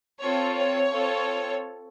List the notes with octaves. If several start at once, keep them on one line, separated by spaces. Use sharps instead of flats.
C4 F4 A4 C#5
C#5
C4 F4 A4